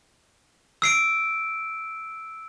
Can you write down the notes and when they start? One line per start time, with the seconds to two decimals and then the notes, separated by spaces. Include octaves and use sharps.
0.82 E6 C7 D7